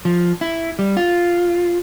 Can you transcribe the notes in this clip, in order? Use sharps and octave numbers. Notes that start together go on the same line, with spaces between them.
F3
E4
G3
F4